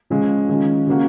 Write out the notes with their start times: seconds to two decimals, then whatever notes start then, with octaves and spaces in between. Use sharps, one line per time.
0.10 C#3 F3 G#3 C#4
0.49 D#3 G#3 C#4 F4
0.87 C#3 F#3 A#3 C#4 F#4